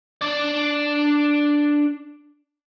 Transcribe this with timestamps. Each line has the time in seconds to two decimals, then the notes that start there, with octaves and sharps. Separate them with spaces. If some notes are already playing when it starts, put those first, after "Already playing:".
0.21 D4 D5